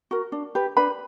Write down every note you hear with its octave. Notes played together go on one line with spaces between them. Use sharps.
F#4 A#4
D4
G4 B4
D4 B4 B5